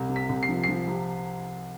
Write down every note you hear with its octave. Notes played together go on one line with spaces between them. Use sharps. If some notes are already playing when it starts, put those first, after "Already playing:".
Already playing: C2
C3
B6
C2
C7
F3
C7
F3
C3